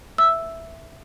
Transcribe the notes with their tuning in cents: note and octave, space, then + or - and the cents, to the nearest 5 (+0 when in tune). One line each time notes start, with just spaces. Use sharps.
E5 +0 E6 +0